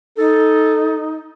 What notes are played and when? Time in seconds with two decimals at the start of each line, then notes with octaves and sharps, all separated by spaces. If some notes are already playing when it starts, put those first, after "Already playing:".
0.18 D#4 A4